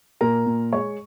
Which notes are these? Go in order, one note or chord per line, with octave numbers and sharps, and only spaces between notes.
A#2 A#4 A#5
A#2
G#3 C#5 C#6